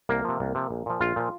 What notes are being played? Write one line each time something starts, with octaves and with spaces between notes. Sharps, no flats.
C2 A#3
C3 F3
C2
C3 F3
A#1
A#2 F3
A#1 F4
A#2 F3